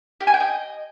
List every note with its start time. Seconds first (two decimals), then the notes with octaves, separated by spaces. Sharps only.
0.20 G4
0.27 G#5
0.34 G5
0.40 D#5